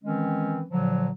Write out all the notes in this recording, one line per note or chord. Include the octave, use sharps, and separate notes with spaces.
D#3 E3 G#3 C4 C#4
A#2 D3 F3 F#3